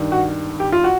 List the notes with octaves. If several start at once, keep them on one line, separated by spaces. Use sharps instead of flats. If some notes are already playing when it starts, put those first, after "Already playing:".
Already playing: G2 D#3
F#4
G4
F4
F#4